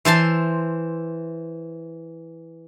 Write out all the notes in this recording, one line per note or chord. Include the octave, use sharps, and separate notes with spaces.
E3 C5 A5 C6